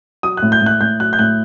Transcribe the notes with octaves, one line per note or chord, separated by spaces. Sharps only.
F#3 D#6
F#6
A2
G6
A2 F#6
A2 G6
F#3 F#6
G6
A2 F#6